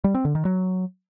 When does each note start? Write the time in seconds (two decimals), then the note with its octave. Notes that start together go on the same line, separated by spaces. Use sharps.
0.04 G3
0.15 C4
0.25 D3
0.35 D#3
0.45 F#3